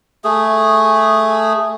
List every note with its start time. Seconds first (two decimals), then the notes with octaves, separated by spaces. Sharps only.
0.24 A3 G#4